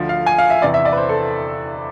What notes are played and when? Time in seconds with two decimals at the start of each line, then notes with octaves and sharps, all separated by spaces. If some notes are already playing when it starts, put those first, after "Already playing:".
Already playing: D2 D3 F3
0.09 F5
0.26 G#5
0.38 F5
0.50 E5
0.62 E2 C3 E3 D5
0.74 E5
0.85 D5
0.92 B4
0.97 C5
1.09 A4